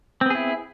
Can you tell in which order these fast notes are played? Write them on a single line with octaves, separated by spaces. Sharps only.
C4 B3 G#4 E4